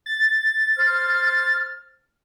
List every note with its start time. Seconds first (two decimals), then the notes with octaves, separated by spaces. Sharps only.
0.06 A6
0.77 C5 F6